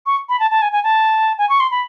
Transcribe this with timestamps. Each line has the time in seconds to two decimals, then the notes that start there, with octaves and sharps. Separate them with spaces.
0.06 C#6
0.29 B5
0.39 A5
0.50 A5
0.61 G#5
0.72 G#5
0.83 A5
1.38 G#5
1.49 C#6
1.60 C6
1.71 B5